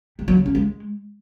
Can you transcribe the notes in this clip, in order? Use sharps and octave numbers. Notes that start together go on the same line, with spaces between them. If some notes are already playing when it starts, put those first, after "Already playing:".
G3
F#3
C#3
C#4
G#3